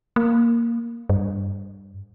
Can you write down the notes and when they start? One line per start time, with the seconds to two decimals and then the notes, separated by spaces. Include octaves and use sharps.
0.16 A#3
1.09 G2